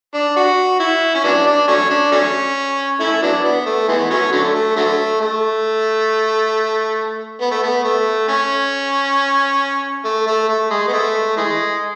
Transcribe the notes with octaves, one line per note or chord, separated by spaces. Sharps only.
D4
F#4
E4
C#4
F#3 B3 D4
D4
F#3 A3 C#4
D4
F#3 A3 C#4
A3 C#4 E4
F#3 B3 D4
B3
A3
E3 G#3 B3
F#3 A3 C#4
D3 F#3 A3
A3
D3 F#3 A3
A3
B3
A3
B3
A3
C#4
A3
A3
A3
G#3
B3
A3
E3 G#3